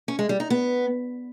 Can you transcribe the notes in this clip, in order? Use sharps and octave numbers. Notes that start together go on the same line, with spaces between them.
C#4
G#3
G3
D#4
B3